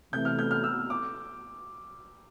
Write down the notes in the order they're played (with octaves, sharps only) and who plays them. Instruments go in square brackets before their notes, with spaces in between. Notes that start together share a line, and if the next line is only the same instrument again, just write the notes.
[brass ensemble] C3 E3 A3 [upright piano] G6
[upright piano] F6
G6
F6
E6
D6